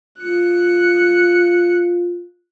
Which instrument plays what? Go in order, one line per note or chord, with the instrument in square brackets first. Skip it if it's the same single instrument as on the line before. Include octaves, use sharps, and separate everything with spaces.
[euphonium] F4 [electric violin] F#6 C#7